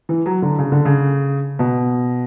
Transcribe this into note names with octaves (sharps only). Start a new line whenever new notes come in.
E3
F#3
D3
C#3
D3
C#3
B2